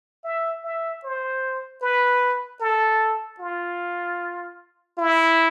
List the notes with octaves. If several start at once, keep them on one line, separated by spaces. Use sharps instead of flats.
E5
E5
C5
B4
A4
F4
E4